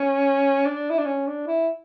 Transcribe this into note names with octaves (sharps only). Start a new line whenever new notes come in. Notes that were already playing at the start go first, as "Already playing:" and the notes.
Already playing: C#4
D4
E4
D4
C#4
D4
E4